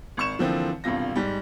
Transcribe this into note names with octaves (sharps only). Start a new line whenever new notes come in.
G#1 C#6 E7
D3 E3 F3 A#3 C4
E1 G2 C3 F4 A#6
G#2 G3